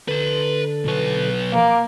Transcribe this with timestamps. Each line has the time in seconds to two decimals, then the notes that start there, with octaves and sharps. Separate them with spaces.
0.08 D3 A4 B4 C6
0.85 B1 B4
1.52 A#3 F5 D6